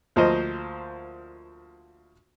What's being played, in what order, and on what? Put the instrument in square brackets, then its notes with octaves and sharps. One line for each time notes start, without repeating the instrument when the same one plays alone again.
[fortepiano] D2 F3 A#3 C5 D#5